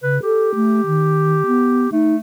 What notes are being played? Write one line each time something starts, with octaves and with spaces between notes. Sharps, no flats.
C#3 B4
G4 A4
A3
D#3
B3
A3 D#4